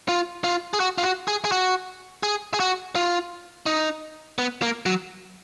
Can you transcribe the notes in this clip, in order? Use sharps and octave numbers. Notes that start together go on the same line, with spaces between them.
F4
F4
G#4
F#4
F4
F#4
G#4
G#4
F#4
G#4
G#4
F#4
F4
D#4
B3
A#3
F#3